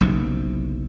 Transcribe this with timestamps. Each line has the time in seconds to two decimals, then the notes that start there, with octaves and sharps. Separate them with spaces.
0.01 F#1 B1 C3